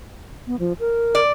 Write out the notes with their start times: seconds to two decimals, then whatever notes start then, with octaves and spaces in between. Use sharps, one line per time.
0.47 B3
0.59 F3
0.80 A#4
1.15 D5